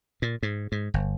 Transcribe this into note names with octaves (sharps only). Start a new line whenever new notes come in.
A#2
G#2
G#2
G1